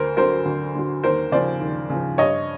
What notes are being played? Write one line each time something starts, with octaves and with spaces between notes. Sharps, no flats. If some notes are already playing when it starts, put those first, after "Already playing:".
Already playing: D2 A#4 C5
D3 F#3 A#4 C5
D2
D3 F#3
D#2 A#4 C5
C#3 F3 C5 D5
D#2
C#3 F3
G2 C#5 D#5